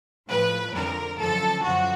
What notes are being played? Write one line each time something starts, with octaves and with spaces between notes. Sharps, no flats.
A2 F3 B4
F2 D3 F3 A#4
F#2 D3 F3 A4
F#2 D3 F3 F#4